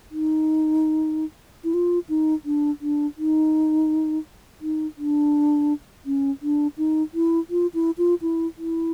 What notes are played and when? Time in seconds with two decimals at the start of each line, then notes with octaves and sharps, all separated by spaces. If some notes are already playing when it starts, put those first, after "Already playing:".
0.11 D#4
1.64 E4
1.74 F4
2.09 D#4
2.45 D4
2.81 D4
3.18 D#4
4.61 D#4
4.97 D4
6.06 C#4
6.42 D4
6.78 D#4
7.14 E4
7.50 F4
7.74 E4
7.98 F4
8.22 E4
8.58 E4